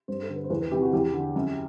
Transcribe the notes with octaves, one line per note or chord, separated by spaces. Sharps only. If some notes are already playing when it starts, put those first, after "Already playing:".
G2 C5
A4
D3
B4
C5
E2 B4
B4
C3 E3 G4
F#4
E2 G4
D3
F#2